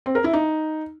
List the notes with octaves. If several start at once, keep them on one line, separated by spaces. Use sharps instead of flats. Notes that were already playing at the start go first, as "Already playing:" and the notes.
C4
A#4
E4
D#4